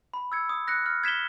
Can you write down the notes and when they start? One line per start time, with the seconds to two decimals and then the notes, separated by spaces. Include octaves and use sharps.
0.14 B5
0.32 E6 G#6 C#7
0.49 D#6
0.68 F#6 A#6 C#7
0.86 F6
1.03 G#6 B6 E7 G7